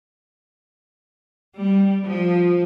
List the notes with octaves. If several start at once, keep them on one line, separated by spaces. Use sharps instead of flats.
G3
F3